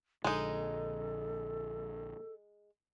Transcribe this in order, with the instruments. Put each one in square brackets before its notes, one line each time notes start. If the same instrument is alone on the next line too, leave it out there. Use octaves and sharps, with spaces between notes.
[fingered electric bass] A#1 D3 [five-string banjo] G#3 D#4 [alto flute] A4